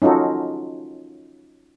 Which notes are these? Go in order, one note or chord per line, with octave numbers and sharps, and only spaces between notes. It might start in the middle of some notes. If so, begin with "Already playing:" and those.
C#4 D#4 F4 F#4 A4